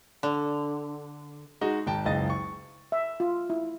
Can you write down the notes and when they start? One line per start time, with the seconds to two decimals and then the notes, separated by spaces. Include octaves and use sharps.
0.23 D3
1.61 G#3 D#4 F#4
1.87 G#1 G5 A5
2.05 F#1 C#2 D#5 A6
2.30 C#6
2.92 E5
3.20 F4
3.50 E4